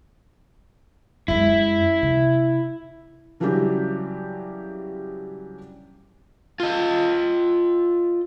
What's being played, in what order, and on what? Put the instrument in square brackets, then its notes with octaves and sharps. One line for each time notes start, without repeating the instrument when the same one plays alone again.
[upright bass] F#2 G#3 [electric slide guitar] E4
[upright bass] C3
[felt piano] C#3 E3 F#3 G3 D4 G4
[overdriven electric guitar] F4 D#5